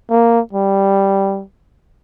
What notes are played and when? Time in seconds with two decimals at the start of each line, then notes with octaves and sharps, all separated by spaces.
0.10 A#3
0.53 G3